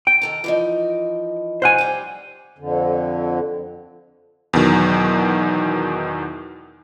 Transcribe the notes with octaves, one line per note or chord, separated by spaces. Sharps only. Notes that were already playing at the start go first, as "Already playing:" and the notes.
G5
D#3 A4 A#5
E3 F3 D#4
C5 F#5 G#5
G3 G5
F2 D3
E2 B2 D#3 F#3